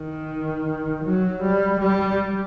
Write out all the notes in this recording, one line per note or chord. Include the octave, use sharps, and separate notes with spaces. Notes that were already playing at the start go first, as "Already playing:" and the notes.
Already playing: D#3
F#3
G3
G3